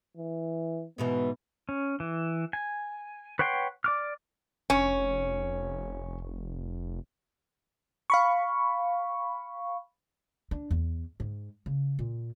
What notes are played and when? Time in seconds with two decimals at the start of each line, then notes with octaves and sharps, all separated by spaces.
0.17 E3
0.98 G#2 B2 E3 B3
1.69 C#4
2.00 E3
2.53 G#5
3.39 B4 C#5 F#5 G5 C6
3.84 D5 D6 F6
4.70 F1 C#4
8.10 F5 B5 C#6
10.51 D4
10.71 E2
11.20 G#2
11.66 C#3
11.99 A#2